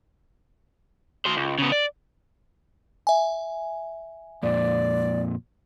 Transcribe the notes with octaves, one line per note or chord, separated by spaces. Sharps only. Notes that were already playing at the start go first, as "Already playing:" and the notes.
F#4 C5
C#2
C#3 B3
D5
E5 G#5
F2 A#2 D5